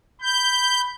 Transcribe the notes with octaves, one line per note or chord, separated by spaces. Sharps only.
B5 G6